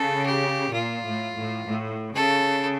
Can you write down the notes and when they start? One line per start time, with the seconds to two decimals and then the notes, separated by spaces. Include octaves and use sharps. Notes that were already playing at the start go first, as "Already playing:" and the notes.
Already playing: C#3 A4
0.26 G4
0.73 A#2 F4
1.04 A2
1.36 A2
1.68 A2
2.15 C#3 A4